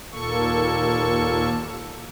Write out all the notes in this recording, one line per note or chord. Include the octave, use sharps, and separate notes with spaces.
D#2 A#2 A#3 A4 C#6